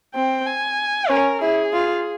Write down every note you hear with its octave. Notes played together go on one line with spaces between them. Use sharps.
C4 G5
G#5
C#4 A#4
E4 G#4
F4